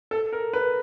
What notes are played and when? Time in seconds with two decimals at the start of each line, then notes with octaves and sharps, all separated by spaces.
0.11 A4
0.33 A#4
0.53 B4